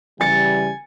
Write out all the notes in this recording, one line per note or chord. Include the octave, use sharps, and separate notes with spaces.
C#3 E3 G3 G#5 A6 C#7